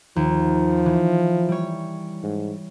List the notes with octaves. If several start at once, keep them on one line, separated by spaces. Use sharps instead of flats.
D#2 F3
E3
G3 C#5
G#2